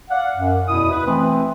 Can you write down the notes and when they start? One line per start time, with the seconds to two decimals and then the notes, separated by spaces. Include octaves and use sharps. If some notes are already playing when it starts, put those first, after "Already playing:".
0.10 D5 F5 F#5
0.37 F#2
0.68 E2 B2 E4 D#6
0.91 B4
1.07 E3 A3 C4